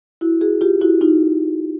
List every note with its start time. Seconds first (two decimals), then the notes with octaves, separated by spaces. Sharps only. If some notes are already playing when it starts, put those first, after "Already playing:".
0.21 E4 F#4
0.41 F#4 G#4
0.61 F4 G4
0.81 E4 F#4
1.01 D#4 F4